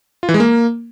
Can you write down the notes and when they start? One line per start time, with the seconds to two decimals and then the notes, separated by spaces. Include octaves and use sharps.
0.23 F4
0.29 E3
0.34 G#3
0.40 A#3